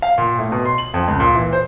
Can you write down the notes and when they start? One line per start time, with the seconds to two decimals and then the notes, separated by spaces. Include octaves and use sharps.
0.02 F5
0.18 A#2
0.39 A2
0.52 B2
0.65 C6
0.78 F#7
0.94 F2
1.08 C#2
1.20 A#2
1.35 E3
1.53 C5